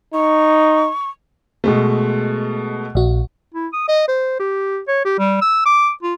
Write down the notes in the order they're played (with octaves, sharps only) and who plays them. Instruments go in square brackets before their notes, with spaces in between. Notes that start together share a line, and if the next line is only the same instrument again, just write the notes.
[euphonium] D#4 [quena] C#6
[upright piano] B2 G#3 A3
[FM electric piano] A#1 F#4
[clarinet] E4
D#6
D#5
C5
G4
C#5
G4
G3
E6
D6
F4